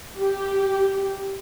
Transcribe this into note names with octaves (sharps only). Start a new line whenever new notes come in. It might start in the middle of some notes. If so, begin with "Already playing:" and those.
G4